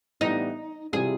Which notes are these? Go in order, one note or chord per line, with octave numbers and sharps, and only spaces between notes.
A2 E3 G3 B3 D4 D#4
C3 E3 G3 C4 F4 G#4